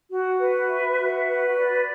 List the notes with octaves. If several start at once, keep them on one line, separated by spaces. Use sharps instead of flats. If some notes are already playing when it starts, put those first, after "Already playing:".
F#4
B4
E5
F#4
B4
D5